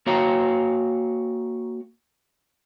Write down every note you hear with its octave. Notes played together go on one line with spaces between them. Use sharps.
A#3 F#4 C#5 F5 G5 A#5